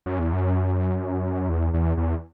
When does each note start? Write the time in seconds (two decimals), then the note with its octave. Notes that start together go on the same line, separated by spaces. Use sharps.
0.06 F#2
0.19 E2
0.33 F#2
1.49 E2
1.73 E2
1.97 E2